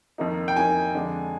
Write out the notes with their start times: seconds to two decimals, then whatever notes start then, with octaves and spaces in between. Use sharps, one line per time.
0.18 F2 D#3 A#3 D#4
0.48 G5
0.56 F2 D#3 A#3 D#4 G#5
0.95 F2 D3 G#3 D4